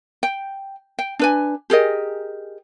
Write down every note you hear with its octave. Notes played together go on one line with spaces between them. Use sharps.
G5
G5
D4 B4 G#5
G4 G#4 A#4 D#5